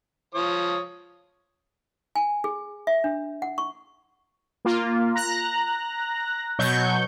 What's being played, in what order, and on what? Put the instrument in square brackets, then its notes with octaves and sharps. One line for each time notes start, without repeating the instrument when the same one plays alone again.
[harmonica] F3 C#5 D#6
[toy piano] G#5
G#4
E5
D4
F#5
C#6
[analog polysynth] A#3 F4
A#5 F#6 A#6
B2 F#3 C#6 G6